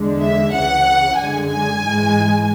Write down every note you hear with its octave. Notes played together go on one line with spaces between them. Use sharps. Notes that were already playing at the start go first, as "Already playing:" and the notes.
Already playing: E2 D3 G#3
E5
C#2 C#3 E3 F#5
F#2 D3 G#3 G#5
G#5
G#2 E3 G#3